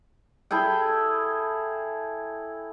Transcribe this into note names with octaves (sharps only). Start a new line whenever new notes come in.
E4 G#4 A4 G5